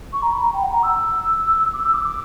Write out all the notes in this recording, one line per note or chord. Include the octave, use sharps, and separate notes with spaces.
C#6
A#5
B5
A#5
G5
F#5
A#5
E6
D6
E6
D6
D6